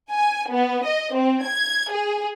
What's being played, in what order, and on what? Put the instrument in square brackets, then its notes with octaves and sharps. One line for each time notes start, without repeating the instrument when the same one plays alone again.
[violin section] G#5
B3
D#5
C4
G#6
G#4